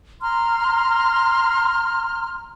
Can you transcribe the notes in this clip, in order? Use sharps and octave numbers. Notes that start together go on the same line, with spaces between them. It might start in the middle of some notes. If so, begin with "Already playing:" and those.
A#5 C6 F6